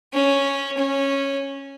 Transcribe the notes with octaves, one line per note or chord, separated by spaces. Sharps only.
C#4
C#4